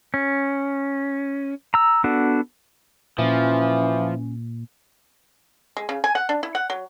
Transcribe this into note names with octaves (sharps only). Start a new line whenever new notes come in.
C#4
A#5 E6
B3 D4 F#4 A4
A#2 E3 F3 C#4
G#3
C#3
G#5
F#5
D4
E4
F#5
F#3